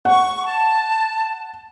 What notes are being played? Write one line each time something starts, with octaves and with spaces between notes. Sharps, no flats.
F#5 C#6
A5